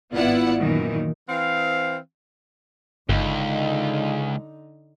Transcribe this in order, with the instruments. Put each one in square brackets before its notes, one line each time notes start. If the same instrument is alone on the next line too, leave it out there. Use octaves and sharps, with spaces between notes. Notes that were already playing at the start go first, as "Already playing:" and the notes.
[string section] G#1 B3 E4 F4 D5 F#5
F#2 A#2 D#3 E3
[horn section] E3 C4 F5
[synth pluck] G1 [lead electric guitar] C#2 [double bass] D3 D#4